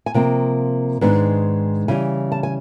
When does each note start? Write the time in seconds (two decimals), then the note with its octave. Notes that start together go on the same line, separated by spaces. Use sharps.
0.06 G#5
0.14 C3 F3 A#3 G5
1.01 G#2 D#3 G#3 B3 D4
1.88 C#3 E3 G3 G#5
2.32 A5
2.43 G#5